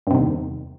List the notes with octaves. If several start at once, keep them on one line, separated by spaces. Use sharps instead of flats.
E2 G2 C3 D#3